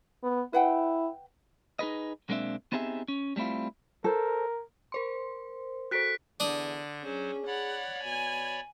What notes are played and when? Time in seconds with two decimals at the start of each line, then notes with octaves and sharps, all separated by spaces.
0.23 B3
0.53 E4 B4 F#5 G5
1.79 D#4 G#4 B4 D#5
2.29 B1 G#3 A#3 C4 D4 E5
2.72 B3 C4 D#4 G4 G#4 E5
3.08 C#4
3.36 G3 A3 C4 E4 F4
4.04 A4 A#4 C5
4.92 A#4 C5 C6
5.91 F#4 A4 C5 F#6 B6 D7
6.40 E2 D3 D4 D#6
7.04 F#3 C#4 G#4 C5
7.47 C#5 D5 F#5 B5
8.04 B2 G#5